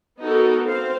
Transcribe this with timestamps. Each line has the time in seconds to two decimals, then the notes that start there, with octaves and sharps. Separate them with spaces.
0.21 B3 D#4 F#4 A4 A#4
0.66 C4 C5 F5